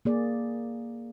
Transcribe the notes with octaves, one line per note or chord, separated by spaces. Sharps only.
A#3 G#4 D5